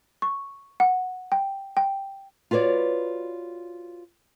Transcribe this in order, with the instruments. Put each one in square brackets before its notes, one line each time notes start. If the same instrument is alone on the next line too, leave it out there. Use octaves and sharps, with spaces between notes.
[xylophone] C#6
F#5
G5
G5
[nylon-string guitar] F4 F#4 B4 C#5 D5